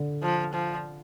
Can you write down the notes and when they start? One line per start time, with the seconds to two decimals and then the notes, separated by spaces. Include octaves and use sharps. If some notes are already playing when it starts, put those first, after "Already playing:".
Already playing: D3
0.22 F3
0.54 F3